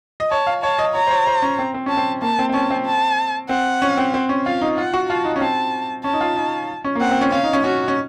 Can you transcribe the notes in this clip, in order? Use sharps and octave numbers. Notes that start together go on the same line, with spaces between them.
D#5
C#5 A5
F5
C#5 A5
D#5
C#5 A#5
C5
C#5
C5
C#4
C4
C4
C#4 A5
C4
A#3 A5
C4
C4
C#4 A5
C4
A5
C4 F#5
C#4
C4
C4
C#4
F4 F5
D#4
F4 F#5
F#4
F4 A5
D#4
C#4
C4 A5
C#4 A5
D#4
F4
D#4
C#4
A#3
C4 F#5
C4
C#4
C#4 F5
D#4
C#4
C#4 F#4
C#4